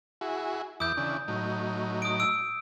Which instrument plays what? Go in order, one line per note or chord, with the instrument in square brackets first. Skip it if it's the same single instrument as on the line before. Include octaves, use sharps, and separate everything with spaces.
[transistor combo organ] E4 F#4 G#4
[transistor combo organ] E2 E4 D6 [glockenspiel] D#6 G6
[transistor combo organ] C#3 E3 D4
A2 F#3 D#4
[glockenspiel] D#6 D7
E6 D7